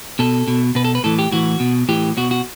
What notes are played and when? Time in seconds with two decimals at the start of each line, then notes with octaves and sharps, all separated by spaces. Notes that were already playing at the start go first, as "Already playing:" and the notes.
0.19 B2 A4
0.48 B2
0.75 B2 B4
0.85 A4
0.95 B4
1.04 A2 E3 A4
1.19 G4
1.32 A2 E3 F#4
1.60 B2
1.89 A2 E3 G4
2.17 B2 F#4
2.31 F#4